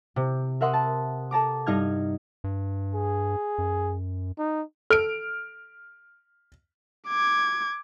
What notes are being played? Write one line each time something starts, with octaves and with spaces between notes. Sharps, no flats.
C3
A#4 E5 F#5 C6 D#6
A5
A4 A5 A#5 D6
G2 D#4 D#5 F6 G#6
G2
G#4
F#2
D#4
A4 F6 D7
D6 G#6